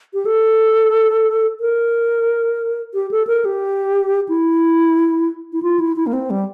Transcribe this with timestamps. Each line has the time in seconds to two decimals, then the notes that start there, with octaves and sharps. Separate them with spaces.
0.14 G4
0.26 A4
1.60 A#4
2.94 G4
3.11 A4
3.27 A#4
3.45 G4
4.29 E4
5.53 E4
5.63 F4
5.79 E4
5.96 E4
6.07 A#3
6.13 C4
6.30 G3